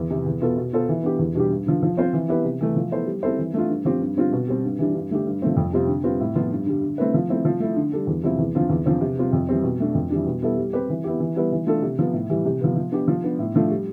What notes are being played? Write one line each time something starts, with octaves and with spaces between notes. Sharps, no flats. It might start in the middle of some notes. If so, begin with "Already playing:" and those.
Already playing: E2
C3 E3
E2
B2 B3 F4 A4
B2
B3 F4 A4 C5
E3
B3 D4 G4
E2
B2 G3 D4 G4
G2
D3 F3
F3
C4 F4 C5
E3
B3 E4 G4 B4
C3
E3 A3
F3
B3 E4 A4 C5
G3
C4 E4 A4 C5
E3
A3 D4 F4
G2
F3 C4 G4
G2
D3 G3 C4 F4
B2
G3 C4
G2
E3 G3 D4
G2
D3 A3 D4 G4
G2
F3 A3 C4
F2
C3 G3 C4 F4
D3
G3 C4 F4 B4
A2
F3 B3 F4
G2
D3 G3
D3
A3 C4 E4 B4
F3
A3 C4 E4
F3
A3 E4
D3
G3 D4 A4
E2
C3 F3 C4 E4
E2
D3 F3 C4 F4
E2
D3 F3 C4
C3
G3 C4 F4
F2
E3 G3 C4
B2
A3 D4
F2
E3 G3 D4
B2
G3 B3 E4 A4
G3
C4 G4 B4
E3
B3 E4 G4
E3
G3 B3 E4 B4
E3
A3 D4 F4 A4
C3
F3 B3
A2
E3 G3
C3
F3 B3
F3
B3 D4 G4
F3
B3 D4
A2
F3 A3 D4
G3